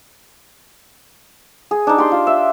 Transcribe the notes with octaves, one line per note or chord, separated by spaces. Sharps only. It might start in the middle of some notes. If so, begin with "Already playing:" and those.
G#4
D4 D#4
G4 D5 C6
F4
E5